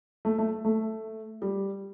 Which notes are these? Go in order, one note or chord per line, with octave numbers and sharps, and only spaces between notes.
A3
A3
A3
G3